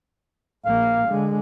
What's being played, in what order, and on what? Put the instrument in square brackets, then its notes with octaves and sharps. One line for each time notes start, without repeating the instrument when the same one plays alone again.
[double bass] A#1 A#3 [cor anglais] F5
[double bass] D3 G#3